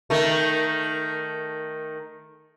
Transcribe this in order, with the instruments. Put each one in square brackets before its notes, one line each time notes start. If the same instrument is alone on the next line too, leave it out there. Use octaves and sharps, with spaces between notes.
[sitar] D#3 A3